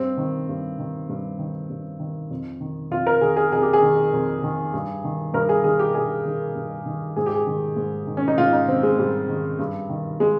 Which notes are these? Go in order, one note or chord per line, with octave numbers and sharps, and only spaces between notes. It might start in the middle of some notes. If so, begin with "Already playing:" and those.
Already playing: G2 C4
D#3
G2
D#3
G2
D#3
G2
D#3
F2
D#3
F2 F4
A#4
D#3 G#4
G#4
F2 G#4
G4
G#4
D#3
F2
D#3
G2
D#3
G2 A#4
G#4
D#3 G#4
G4
G2 G#4
D#3
G2
D#3
G#2 G#4
G4
G#4
D#3
G#2
D#3
C#4
D#4
G#2 F4
D#4
D#3 C4
G#3
G#2 G3
D#3
G2
D#3
G#3